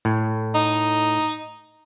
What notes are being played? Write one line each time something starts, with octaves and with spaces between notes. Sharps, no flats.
A2
D#4